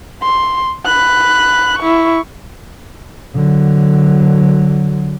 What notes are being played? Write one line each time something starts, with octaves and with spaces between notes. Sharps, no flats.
C6
B5 F#6
E4 C#6
D3 F#3